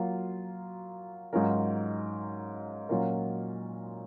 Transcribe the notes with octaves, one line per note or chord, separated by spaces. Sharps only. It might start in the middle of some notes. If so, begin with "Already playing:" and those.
Already playing: F#3 A#3 F4
G#2 F#3 C#4 F4 A#4
A#2 F#3 C#4 F4 A#4